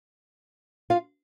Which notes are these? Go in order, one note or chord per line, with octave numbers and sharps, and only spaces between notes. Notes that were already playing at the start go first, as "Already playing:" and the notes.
F4 F5